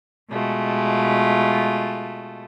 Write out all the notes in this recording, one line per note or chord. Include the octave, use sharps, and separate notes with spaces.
B2 G#3 A3 F4